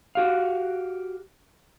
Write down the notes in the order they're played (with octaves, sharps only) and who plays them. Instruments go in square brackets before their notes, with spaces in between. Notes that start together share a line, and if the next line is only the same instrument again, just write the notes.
[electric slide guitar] F#4 G4 F5